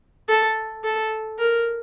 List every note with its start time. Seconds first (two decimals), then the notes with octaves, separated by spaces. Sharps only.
0.28 A4
0.84 A4
1.38 A#4